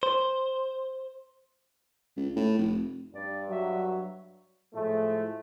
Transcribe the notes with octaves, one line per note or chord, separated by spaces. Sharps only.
C5
C#2
A2
F1
G2 D5
F#3 E5
A2 F3 G#3 A3